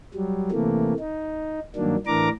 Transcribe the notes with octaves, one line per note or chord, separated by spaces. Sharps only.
F#3 G3
C3 E3 A3 A#3
D#4
G2 D#3 F#3 A#3 D4
A2 E3 D4 A#4 A#5 D6